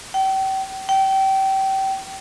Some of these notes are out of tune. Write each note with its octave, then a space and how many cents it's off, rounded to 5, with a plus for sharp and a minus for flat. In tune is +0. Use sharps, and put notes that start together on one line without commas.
G5 -35
G5 -25